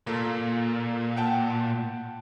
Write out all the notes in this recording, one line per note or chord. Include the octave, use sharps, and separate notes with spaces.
A#2 A#3 F4 A4
F#5 G5 A5